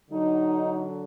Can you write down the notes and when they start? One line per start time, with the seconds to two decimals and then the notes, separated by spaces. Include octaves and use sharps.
0.10 D3 F#3 D#4